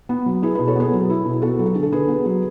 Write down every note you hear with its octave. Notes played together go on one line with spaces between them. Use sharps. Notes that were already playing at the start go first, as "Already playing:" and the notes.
B3
F#3
E4 G#4 B4
B2 G#4 B4
A4 C#5
B3 G#4 B4
F#3
E4
B2
B3 F#4 A4
F#3
F#4
D3 G#4
A4
D3 G#4 B4
B3
F#3